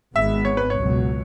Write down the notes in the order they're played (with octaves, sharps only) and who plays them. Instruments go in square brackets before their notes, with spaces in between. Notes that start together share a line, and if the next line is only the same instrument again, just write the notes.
[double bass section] G#1 G#2 G#3 B3 [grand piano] E5
[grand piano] C#5
B4
C#5
[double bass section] C#2 B2 F#3